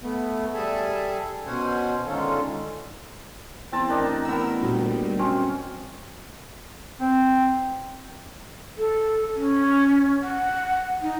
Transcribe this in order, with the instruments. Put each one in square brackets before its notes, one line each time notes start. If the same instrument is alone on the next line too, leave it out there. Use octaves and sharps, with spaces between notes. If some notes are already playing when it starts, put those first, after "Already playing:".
[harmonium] A3 B3
G3 G#4 A4 E5 G#5 A5
B2 C#4 C5 F#5 G#5
D3 D#3 G#3 C#4 F4 A4
[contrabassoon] E2 [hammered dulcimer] C4 A5
[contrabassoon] A1 [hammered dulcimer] D#3 D4 D#4
[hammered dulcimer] D#3 B3 [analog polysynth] A#4 E6
[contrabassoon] D2 [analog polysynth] A#2 G3
[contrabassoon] F#2 [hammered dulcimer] C4 C#4
[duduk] C4
[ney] A4
C#4
F#5
D#4